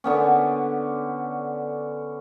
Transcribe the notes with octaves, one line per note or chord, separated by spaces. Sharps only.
D3 B3 C#4